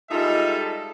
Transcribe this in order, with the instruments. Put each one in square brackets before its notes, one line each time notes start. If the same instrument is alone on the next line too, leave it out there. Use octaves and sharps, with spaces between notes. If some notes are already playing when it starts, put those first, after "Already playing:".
[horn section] G3 G#3 D#4 F4 A4 E5